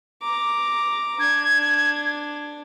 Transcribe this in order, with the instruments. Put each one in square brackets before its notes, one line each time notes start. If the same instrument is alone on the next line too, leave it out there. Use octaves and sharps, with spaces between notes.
[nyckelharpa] A#5 D6
[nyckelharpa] D4 [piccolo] G#6